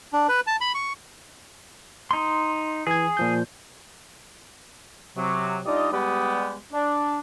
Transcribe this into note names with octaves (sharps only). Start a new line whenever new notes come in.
D4
B4
A5
B5
C#6
D#4 C6
E3 G#4 G#6
A#2 F3 G6
C3 F#3
G3 D4 D#4 F4 D5 D#5
G3 G#3 B3 G4
D4